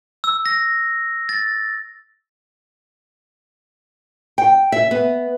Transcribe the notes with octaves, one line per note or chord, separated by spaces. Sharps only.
E6
A#6
A6
G5
E5
B3